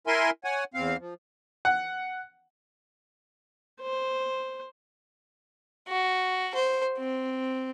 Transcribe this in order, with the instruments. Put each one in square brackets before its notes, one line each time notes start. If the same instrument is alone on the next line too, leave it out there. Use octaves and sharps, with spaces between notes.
[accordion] E4 A#4 E5 G#5 C6
C#5 F#5 G#5
E2 C4 F5
F3
[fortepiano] F#5
[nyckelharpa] C5
[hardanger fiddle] F#4
C5
C4